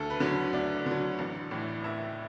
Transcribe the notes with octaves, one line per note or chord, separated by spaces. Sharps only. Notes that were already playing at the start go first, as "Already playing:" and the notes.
Already playing: D2 A4
B4
D3 F#3
D2 D5
D3 F#3
A1
A2 E3
A1 E5